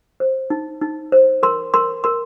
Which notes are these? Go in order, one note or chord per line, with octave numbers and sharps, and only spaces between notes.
C5
D#4
D#4
C5
A#4 C6
A#4 C6
A#4 C6